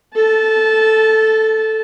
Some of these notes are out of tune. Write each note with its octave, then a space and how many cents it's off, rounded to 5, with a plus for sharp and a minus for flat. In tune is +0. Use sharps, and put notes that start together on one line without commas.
A4 +0 A5 -20